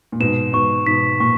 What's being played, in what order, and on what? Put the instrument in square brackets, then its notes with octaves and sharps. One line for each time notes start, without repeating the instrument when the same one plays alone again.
[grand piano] A#2
[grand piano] G#2 B2 [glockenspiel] E7
[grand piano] G#2 B2 [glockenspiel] C#6
[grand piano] G#2 B2 [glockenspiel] B6
[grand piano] A#2 [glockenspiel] C#6